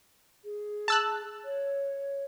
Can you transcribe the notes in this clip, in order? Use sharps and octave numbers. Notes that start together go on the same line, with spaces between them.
G#4
A5 E6 F#6
C#5